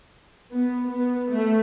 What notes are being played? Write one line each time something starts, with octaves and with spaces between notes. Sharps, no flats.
B3
B3
A3